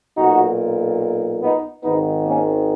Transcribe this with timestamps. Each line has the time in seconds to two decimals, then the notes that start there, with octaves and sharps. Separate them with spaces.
0.17 B1 A#2 D#4 F#4
1.43 B3 D#4
1.84 G#1 G#2 D#3 B3 D#4
2.26 A#3 C#4